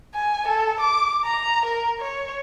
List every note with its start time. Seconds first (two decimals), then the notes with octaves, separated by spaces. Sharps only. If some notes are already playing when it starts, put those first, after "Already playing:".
0.15 G#5
0.48 A4
0.81 D6
1.25 A#5
1.66 A#4
2.00 C#5